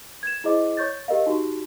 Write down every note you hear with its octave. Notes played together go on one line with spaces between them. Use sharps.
G#6 E7
E4 G#4 C5 D#5 D6
C#5 C#6 G6 A6
G4 A#4 D#5 F5
D#4 F#4 G4